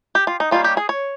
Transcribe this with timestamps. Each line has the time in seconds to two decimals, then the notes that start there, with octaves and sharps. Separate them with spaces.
0.15 G4
0.27 F4
0.40 D#4
0.51 D#3 G3 A#3 C#4 F4
0.64 G4
0.77 G#4
0.89 C#5